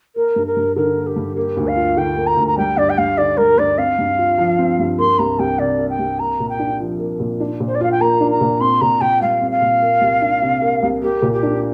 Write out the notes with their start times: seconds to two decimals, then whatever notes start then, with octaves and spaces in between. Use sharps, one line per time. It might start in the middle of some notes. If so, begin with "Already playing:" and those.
0.16 A#3 A#4
0.36 G2
0.47 A#4
0.56 G2
0.76 D3 A#4
0.96 A#3
1.07 G4
1.16 G2
1.36 A#3 G4
1.57 D2
1.67 F5
1.76 F4
1.97 D3 G5
2.17 A#3
2.27 A#5
2.37 D2
2.48 A#5
2.57 G3 G5
2.77 G2 D5
2.90 G5
2.98 G2 F5
3.18 D3 D5
3.37 G3 A#4
3.58 G2 D5
3.77 C4 F5
3.98 G2
4.18 F4
4.38 F3
4.59 C4
4.79 G2
4.99 A#3 C6
5.19 C2 A#5
5.39 C2 G5
5.59 C3 D5
5.79 A#3
5.90 G5
5.99 C2
6.19 A#3 A#5
6.40 A#2
6.49 G5
6.59 D4
6.80 F3
6.99 A#3
7.20 A#2
7.40 D4
7.60 A#2
7.68 C5
7.75 D5
7.81 F4 F5
7.92 G5
8.01 A#3 A#5
8.21 D4
8.31 A#5
8.41 A#2
8.61 C4 C6
8.81 A#2 A#5
9.01 A#2 G5
9.21 G3 F5
9.41 C4
9.51 F5
9.61 A#2
9.82 A#3
10.01 C2
10.22 D4
10.42 C3
10.62 A#3
10.83 C2
11.02 A#3 G4
11.22 A#2
11.32 G4
11.43 D4